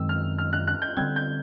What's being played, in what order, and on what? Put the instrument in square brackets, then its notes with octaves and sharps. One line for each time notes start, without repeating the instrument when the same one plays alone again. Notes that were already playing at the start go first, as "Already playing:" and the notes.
Already playing: [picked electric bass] F#2 D#3 G#3 C4 [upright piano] E6
[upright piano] F6
F6
F#6
F#6
G6
[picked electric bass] D3 G3 C4 [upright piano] G#6
[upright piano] G6